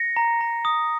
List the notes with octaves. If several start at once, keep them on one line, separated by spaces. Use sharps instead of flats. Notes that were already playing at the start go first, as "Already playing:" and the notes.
Already playing: A#6 C#7
A#5
A#5
D#6